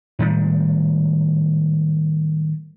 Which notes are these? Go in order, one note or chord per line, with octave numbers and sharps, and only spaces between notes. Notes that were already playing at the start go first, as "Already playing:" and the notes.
A2 D#3 G3 G#3